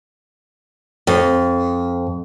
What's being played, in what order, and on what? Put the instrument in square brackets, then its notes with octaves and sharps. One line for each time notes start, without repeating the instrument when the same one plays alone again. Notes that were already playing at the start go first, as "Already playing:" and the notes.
[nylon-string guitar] F2